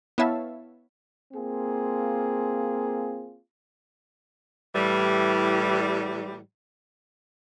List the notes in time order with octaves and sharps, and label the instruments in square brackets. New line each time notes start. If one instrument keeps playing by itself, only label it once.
[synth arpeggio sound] B3 E4 C#5 E5 F5 A5
[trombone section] A#3 C4 F4 G#4
[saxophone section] A2 E3 G3